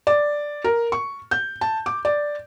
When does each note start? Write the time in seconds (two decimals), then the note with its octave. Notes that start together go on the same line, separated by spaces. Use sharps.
0.07 D5
0.64 A#4
0.92 C#6
1.31 G6
1.61 A5
1.86 D6
2.05 D5